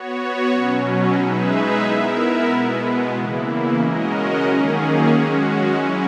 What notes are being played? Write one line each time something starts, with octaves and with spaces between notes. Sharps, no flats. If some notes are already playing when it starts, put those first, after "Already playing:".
Already playing: B3 F#4 C#5
B2 F#3 C#4
G#3 D#4 G#4 B4 E5
B3 E4 A#4 E5
B2 G#3 B3
C#3 E3 A#3 E4
G#3 C#4 F#4 A#4 D#5
D#3 F#3 A#3 C#4 G#4
G#3 C#4 F#4
F#3 C#4 E4